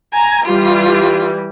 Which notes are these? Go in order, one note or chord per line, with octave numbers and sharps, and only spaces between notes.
G#5 A#5
E3 G3 F4